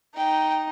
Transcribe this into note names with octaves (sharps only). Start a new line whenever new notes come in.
D#4 G5